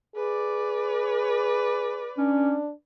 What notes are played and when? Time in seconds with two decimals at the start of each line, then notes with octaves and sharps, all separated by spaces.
0.16 G#4 B4 D5
2.18 C#4 D4